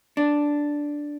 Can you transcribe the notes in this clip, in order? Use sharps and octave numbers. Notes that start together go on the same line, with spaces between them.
D4